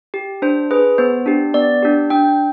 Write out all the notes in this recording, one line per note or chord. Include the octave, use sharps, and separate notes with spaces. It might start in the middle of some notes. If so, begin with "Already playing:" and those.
G4
D4 C5
G#4 B4
B3 C5
D4 G4
B3 D5
D4 G4
D4 G5